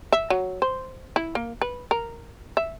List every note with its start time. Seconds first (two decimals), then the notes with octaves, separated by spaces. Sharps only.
0.12 E5
0.30 F#3
0.62 C5
1.16 E4
1.35 A#3
1.62 B4
1.91 A#4
2.57 E5